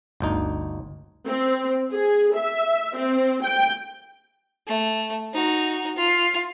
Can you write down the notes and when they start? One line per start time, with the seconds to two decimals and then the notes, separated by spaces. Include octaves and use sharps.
0.20 G1 D2 D#4
1.26 C4
1.91 G#4
2.34 E5
2.97 C4
3.44 G5
4.67 A3
5.34 D#4 F#4
5.96 F4